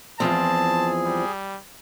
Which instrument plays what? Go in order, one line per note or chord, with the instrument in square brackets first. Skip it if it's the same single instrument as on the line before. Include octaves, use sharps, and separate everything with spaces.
[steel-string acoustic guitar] E2 F3 C4 [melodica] G#4 [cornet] A5
[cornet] G3